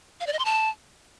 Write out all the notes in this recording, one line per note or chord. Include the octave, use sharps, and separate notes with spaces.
F5
D5
D#5
C6
A5